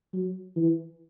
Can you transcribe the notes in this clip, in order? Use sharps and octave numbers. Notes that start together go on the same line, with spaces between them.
F#3
E3